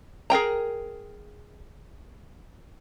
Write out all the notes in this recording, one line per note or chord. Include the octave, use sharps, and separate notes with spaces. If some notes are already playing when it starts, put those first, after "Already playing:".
G#4 A#4 G5 A#5